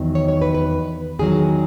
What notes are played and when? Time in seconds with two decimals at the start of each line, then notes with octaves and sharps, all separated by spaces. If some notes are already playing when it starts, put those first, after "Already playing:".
Already playing: E2 D#3 F#3
0.15 C#5
0.28 C#5
0.42 B4
0.54 B4
1.19 E2 D#3 F#3 G#4